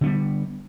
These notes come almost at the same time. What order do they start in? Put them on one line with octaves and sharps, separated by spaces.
D3 B3 G3